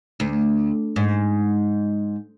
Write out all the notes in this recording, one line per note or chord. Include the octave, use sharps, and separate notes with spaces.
D2
G#2